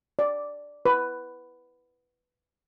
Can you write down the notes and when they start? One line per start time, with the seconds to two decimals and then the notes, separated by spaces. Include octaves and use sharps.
0.19 D5
0.85 B4